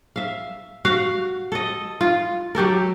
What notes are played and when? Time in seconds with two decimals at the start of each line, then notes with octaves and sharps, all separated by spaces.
0.16 E5 F5
0.85 F#4 F5
1.52 A4 D#5
2.01 F4
2.55 F#3 G4 A4 A#4